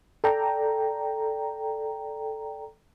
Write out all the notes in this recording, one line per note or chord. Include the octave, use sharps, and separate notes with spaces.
A4 D5 G5 A#5